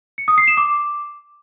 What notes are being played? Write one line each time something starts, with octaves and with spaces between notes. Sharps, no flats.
C#7
D#6
C7
E7
D6